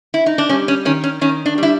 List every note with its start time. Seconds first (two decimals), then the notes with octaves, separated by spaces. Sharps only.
0.14 E4
0.26 D#4
0.38 D4
0.49 G3 C#4
0.68 C#4
0.85 D#3 C#4
1.04 C#4
1.21 D#3 C#4
1.46 D4
1.58 G3 E4